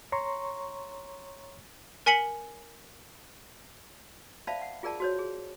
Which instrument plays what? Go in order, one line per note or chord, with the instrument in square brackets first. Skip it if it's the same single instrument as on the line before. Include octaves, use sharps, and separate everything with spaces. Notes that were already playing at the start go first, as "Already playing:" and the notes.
[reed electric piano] C#5 A#5 C6 C#6
[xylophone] A#4 G#5 B6 C#7 F#7
[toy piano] C5 D5 E5 F5 A5 B5
F#5
F4 G#4 A#4 D5 A5
F#4 C5 C#5
G#4